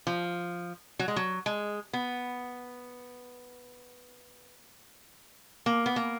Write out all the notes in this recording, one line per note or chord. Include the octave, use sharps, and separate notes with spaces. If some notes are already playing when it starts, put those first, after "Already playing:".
F3
F#3
G#3
F#3
G#3
B3
A#3
B3
A#3